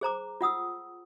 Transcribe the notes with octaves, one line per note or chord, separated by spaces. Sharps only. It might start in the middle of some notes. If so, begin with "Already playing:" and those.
G#4 C5 A#5 D6
F4 F#5 D#6 E6